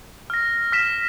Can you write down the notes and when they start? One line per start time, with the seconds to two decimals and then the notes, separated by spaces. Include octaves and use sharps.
0.30 F6 A#6
0.72 F6 B6 E7